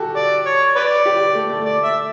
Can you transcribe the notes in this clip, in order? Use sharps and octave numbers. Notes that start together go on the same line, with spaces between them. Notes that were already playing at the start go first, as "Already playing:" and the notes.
Already playing: F#4 G4 A4
D5
C#5
B4 D5
G4
A3
A3
D5
E5